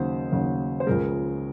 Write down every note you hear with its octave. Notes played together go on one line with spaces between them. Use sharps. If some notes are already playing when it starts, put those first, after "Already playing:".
Already playing: D#2 C#3 F#3 C5
D#2 C#3 F#3
C5
C#2 C#3 F3 G#3 A#4